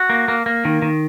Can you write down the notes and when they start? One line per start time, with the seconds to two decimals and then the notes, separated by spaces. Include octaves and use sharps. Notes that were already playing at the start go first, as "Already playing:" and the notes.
Already playing: F#4
0.10 A#3
0.28 A#3
0.46 A#3
0.65 D#3
0.82 D#3